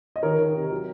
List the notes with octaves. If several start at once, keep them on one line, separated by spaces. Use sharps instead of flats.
D#5
D#3 A#4 C#5
D#3
C3
F#3